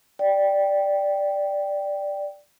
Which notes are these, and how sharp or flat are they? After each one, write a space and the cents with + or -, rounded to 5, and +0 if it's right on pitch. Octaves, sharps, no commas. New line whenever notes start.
D5 +0 G5 +0